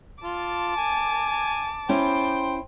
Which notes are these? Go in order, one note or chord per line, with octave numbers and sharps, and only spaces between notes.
F4 A5 D6
G#5
C#4 E4 C5 G5